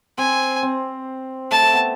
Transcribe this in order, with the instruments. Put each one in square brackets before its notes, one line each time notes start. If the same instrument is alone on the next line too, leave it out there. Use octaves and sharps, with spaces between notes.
[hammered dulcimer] C4 [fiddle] G#5
[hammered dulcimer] C4
[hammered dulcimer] A3 [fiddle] A5
[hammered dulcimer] A3
B3